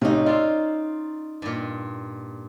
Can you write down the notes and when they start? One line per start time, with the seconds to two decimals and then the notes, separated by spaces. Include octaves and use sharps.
0.02 B1 A2 C3 C#4 D#4
0.26 F4 D5 F5 E6
1.42 G2 A#2